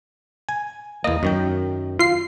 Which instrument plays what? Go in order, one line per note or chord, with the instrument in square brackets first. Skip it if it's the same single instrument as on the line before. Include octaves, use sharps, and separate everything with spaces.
[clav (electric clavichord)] G#5
[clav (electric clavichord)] E2 A#3 [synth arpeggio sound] D#5
[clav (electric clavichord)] F#2 D#3 G5
[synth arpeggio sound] F4 C7